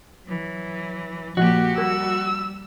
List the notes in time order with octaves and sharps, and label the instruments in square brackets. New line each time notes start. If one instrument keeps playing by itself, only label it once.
[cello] E3 F#3
[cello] A#2 G4 [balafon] F3 A#3 [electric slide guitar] F#4
[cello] G3 [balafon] A#4 [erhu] E6